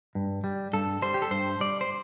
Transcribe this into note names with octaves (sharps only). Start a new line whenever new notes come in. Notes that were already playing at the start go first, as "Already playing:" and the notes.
G2
G3
G2 A4
G3 C5
G4
A4
G2 C5
G3 D5
C5